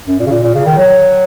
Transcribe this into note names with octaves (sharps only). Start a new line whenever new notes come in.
F#2
A#2
C#3
A#2
A#2
C#3
D#3
F#3